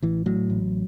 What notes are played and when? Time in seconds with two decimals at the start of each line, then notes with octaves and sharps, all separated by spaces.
0.02 A1 E3
0.26 A2 F#3
0.50 A1